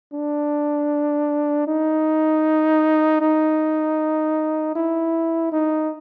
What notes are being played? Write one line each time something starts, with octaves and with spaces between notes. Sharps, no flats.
D4
D#4
D#4
E4
D#4